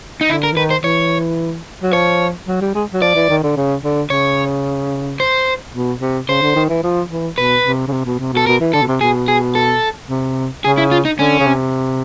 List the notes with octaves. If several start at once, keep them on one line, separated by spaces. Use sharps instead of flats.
D#4
D3 E4
A#4
E3
D#3 B4
C5
E3 C#5
F#3
F3 C#5
F#3
G3
G#3
F#3
F3 D5
E3
D#3
D3
C#3
D3
C#3 C#5
C5
B2
C3
C#3 C5
D3
D#3
E3
F3
E3
B2 B4
C3
C#3
C3
B2
C3
B2 A4
B2 A#4
E3
D3 A4
B2
C3
B2 G#4
G#4
A4
C3
C#3 G#4
E4
F4
D#4
D3 C#4
C#3
C3